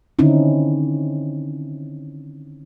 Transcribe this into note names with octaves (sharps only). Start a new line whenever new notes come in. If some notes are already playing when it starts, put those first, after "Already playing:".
D3 D#3 C4 C#4 D#4 E4